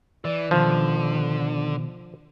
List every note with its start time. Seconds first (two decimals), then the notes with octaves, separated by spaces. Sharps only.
0.25 E3 D5
0.51 B2 D3 D#3 F3